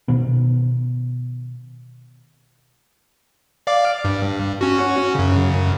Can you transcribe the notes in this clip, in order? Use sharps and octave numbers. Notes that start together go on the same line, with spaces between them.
B2 D#3 B3
D5 F5 D6
G2
C#4 F#4
F#2 C#3